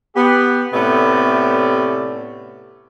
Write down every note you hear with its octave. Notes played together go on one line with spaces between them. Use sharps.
B3 G4
A2 C3 A3 B3 C#4 D5